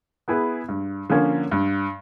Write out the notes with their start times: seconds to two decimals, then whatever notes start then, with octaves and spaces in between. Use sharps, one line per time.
0.28 B3 E4 G#4 B4
0.69 G2
1.10 D3 F3 A#3 C#4
1.52 G2